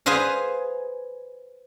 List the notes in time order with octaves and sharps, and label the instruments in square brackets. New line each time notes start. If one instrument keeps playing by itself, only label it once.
[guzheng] G#4 B4 C5 F5 G#5